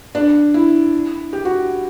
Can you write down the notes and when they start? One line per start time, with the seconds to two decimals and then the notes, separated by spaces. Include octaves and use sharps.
0.15 D4
0.54 E4
1.33 G4
1.45 F#4